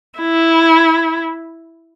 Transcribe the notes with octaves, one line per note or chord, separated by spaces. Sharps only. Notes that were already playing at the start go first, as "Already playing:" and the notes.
E4